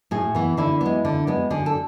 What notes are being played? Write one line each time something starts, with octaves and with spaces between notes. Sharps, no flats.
A2 G#4
E3 B3
D3 E4
G#3 B3
D3
G#3 B3
D3 G#4
A4